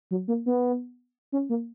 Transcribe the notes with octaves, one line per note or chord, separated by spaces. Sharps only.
F#3
A#3
B3
C#4
A#3